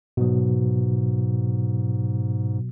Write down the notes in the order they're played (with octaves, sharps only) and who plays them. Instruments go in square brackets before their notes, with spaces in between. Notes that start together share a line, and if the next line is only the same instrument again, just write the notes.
[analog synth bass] G#2 [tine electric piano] B2 F#3